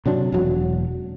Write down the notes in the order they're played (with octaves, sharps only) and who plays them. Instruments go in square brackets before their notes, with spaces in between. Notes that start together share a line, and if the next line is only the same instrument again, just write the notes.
[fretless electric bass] C3 F#3 D4
E1 F#3